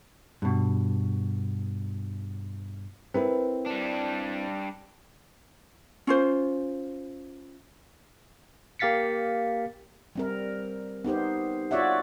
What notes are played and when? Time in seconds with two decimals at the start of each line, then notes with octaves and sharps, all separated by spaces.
0.42 G2 B2
3.14 C4 E4 A#4 B4
3.66 G3 D4
6.07 C#4 F4 C5
8.79 A#3 G4 F5 A6 B6 C#7
10.16 G3 C4 A#4
11.04 B3 D#4 G4 C5
11.71 F4 F#4 C#5 D5 E5 F#5